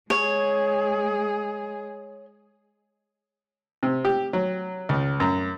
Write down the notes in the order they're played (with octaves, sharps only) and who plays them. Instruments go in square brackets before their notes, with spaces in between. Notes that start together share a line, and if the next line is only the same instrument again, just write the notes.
[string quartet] G#3 G#4 [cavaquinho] C#5
[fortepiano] C3
G4
F#3
C#2
F#2